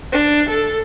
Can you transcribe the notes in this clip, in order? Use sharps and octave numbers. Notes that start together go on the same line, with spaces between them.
D4
A4